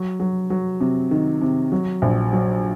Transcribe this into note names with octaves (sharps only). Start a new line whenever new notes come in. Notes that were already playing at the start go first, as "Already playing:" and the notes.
Already playing: F#3
F#3
F#3
C3
D#3
C3
F#3
A#1
F#3